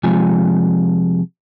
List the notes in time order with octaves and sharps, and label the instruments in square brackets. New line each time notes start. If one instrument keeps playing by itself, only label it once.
[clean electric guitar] C3 F3 G#3 F4 G#5